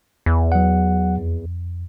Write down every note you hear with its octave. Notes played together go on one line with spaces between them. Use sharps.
E2
F#3 F#5
F2